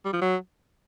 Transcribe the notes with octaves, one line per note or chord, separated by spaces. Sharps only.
G3
F3
F#3